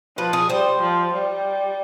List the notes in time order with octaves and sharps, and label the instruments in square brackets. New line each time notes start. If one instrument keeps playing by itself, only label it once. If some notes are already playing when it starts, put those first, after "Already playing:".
[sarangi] F3 [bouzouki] B4
[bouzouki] G#4
[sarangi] G3 [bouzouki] C5
[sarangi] F3
G3